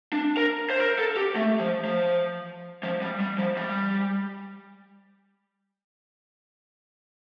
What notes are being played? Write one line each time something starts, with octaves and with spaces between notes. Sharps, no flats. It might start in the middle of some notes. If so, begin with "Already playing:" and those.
D4
A#4
C5
A#4
A4
G4
A3
F3
F3
F3
G3
G3
F3
G3